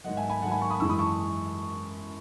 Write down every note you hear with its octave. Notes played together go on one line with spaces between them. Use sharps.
G#2 D#3 F#3 D#5 F#5
E5 G#5
G#5 B5
G#2 D#3 F#3 F#5 A5
G#5 B5
A5 C#6
B5 D#6
F#2 E3 G#3 C#6 E6
B5 D#6
A5 C#6